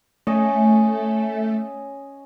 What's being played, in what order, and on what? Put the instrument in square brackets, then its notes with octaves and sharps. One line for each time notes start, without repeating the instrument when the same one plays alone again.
[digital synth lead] A3 [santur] C#4 D#5 G#5